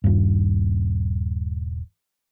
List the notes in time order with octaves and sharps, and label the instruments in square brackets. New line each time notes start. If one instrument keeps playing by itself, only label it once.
[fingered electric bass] D#1 G2